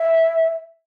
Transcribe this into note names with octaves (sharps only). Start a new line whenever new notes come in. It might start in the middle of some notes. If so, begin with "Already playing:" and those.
Already playing: E5